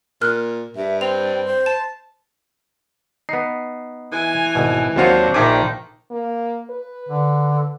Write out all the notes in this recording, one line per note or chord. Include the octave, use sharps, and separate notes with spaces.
A#2 A#4 F6 F#6
G2 E5
C4 G5 F7
C5
A5 E7
B3 D#4 C7
E3 G#5
G#1 B2
D#2 F#3 C4 D4 F4 F#4 C5 C#5
A#1 D#3 E5 G5 G#5 D6
A#3
B4
D3